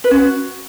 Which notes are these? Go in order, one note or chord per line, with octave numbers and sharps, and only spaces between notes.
B4
C#4
F#4